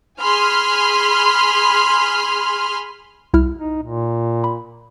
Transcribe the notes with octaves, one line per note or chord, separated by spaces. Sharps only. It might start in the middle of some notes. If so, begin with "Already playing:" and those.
G#4 G#5 B5 C6 F6
C2 E4 F6
D#4
A#2
B5